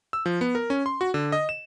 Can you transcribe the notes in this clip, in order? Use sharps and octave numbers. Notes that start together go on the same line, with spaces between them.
E6
F3
B3
A#4
C#4
C6
F#4
D3
D#5
E7